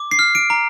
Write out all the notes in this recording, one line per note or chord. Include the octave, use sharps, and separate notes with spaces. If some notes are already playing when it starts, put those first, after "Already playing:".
Already playing: D6
C7
F6
D7
A#5